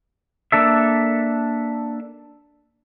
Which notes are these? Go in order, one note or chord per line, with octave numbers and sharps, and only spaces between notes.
A#3 D4 A4 E5